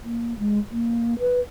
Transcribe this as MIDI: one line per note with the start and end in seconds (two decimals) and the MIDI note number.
0.04 0.37 58
0.39 0.59 56
0.71 1.18 58
1.19 1.40 71